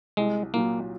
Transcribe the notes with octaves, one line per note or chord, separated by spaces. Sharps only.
C2 G#3
A#2 F#3 A#3